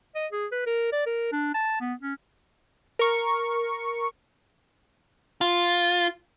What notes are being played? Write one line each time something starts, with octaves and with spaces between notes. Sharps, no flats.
D#5
G#4
B4
A#4
D5
A#4
D4
A5
B3
C#4
A#4 C#6
F4